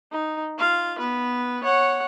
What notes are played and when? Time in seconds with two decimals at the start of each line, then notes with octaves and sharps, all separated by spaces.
0.12 D#4
0.58 F4 F5
0.98 B3 B4
1.63 C#5 F#5